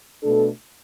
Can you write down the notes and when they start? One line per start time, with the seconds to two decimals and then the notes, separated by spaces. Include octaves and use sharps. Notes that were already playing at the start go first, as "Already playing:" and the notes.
0.23 B2 A3 D4 A4